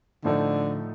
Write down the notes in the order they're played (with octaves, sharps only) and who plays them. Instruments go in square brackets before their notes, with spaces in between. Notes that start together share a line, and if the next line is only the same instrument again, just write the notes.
[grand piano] A2 F3 A3 D#4 [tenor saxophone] D3